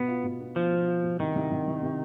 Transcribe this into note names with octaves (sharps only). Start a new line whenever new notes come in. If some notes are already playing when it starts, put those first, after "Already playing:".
Already playing: B2 B3
F4
B2
B3
F3 B3
B2
F4
B2
C2 D#3
C2
C2
C2
C3